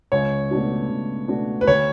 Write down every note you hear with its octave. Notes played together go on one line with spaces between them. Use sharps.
C#2 C#5
B2 A3 D4 F#4
C#2
B2 A3 D4 F#4
B4
D2 C#5